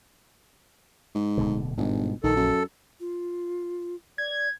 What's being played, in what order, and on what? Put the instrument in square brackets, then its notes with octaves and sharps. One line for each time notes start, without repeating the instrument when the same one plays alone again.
[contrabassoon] G#2
[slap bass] D1 B2 D3
[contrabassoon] G1 [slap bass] G#2 B2 G#3
[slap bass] A#1 [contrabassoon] D#3 [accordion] A4
[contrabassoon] F#2
[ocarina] F4
[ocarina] D5 [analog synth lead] G#6